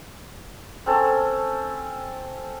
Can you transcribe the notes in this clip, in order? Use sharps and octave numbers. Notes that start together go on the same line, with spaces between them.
C4 C#4 A4